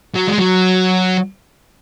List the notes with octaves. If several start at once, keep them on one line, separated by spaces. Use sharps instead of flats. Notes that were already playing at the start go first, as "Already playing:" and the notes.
F#3
G#3
F#3